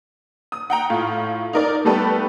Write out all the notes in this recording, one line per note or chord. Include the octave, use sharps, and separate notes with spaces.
D#6
F#5 G5 A#5
A2 F4
D#4 A#4 D5
D#3 G3 A3 B3 A4 B4